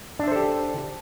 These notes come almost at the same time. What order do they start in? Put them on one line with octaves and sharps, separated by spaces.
D4 E5 C5 A4 G4